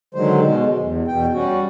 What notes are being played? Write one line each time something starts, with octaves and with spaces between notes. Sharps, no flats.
D3 D#3 F#3 G#3 C5
B2 G#3
E2
E2 B2 G5
G3 C#4 F#4